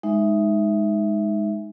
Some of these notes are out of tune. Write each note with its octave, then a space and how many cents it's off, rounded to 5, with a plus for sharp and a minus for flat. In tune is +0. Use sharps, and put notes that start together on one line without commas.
G#3 +0 D#4 +0 E5 +0